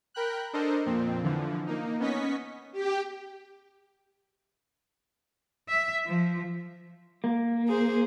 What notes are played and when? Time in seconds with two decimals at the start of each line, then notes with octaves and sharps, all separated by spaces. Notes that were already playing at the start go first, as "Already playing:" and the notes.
0.14 A#4 G5 B5 F#6
0.53 D4 A4 A#4 C5 D#5
0.86 F2 A#2 C4
1.23 D3 E3 F3
1.67 A#3 D#4
2.00 B3 C#4 D#5 C#6 B6
2.72 G4
5.69 E5
6.07 F3
7.24 A#3
7.68 G#4 C5